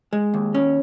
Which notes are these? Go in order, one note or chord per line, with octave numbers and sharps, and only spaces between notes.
G#3
D#2
C#4